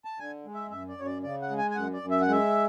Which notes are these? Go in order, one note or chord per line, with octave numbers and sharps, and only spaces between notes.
A5
D3 G#5
G#3
E5
F#2 E5
D5
F#2 C#5
D5
C#3 D5
F#5
G#3
G#5
G#5
F#2 F#5
D5
F#2
E5
F#5
G#3 E5